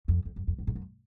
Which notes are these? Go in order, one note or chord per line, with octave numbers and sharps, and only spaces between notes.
F2
F2
F#2
F2
F#2
G#2
F#2